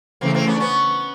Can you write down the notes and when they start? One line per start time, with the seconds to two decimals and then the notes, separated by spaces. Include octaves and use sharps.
0.21 C#3 E3 A3 A#3 C4
0.34 A#3 C4
0.47 B3 C#4
0.54 D4
0.60 B3 C#4